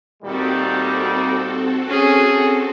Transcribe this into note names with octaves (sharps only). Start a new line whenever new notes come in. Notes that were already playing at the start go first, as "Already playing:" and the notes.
A#2 D#3 G3 C4 F#4 A4
C#4 G#4